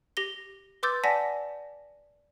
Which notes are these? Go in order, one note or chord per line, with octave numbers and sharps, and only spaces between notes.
G4 A#6 G7
B4 C6 D6 E6 G6 A6
D5 F#5 G#5 A5 A#6 B6